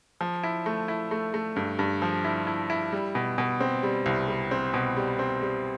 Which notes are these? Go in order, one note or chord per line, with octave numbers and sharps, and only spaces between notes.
F3
E4
A3
E4
A3
A3
G2
G2
F3
E4
E4
E4
G3
B2
B2
C4
G3
C2
G3
C4
B2
G3
C4
G3